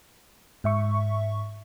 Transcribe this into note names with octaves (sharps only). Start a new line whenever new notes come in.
G#2 E5 C#6